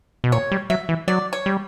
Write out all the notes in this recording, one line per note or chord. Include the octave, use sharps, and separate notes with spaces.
B2
A#2 C#5
G3
F#3 E5
E3
F#3 D5
C#5
G3